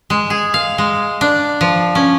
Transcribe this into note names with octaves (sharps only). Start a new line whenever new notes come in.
G#3
G#4
F5
G#3
D4
F3
C#4